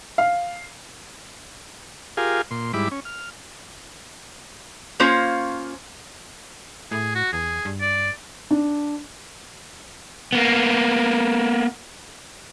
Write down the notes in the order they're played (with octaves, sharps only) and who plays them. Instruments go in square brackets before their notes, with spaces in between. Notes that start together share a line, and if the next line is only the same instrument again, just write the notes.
[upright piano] F5
[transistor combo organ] F4 G4 G#4 A#4 F5 G#5
A#2 C6
G#2 G3 E4 B5 D6
C#4
F6
[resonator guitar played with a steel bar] A#3 C#4 F4 C5 C#5
[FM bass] A2 [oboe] G#4
[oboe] F#4
[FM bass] E2 [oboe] G#4
[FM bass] G2
[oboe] D5
[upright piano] D4
[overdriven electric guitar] A#3 B3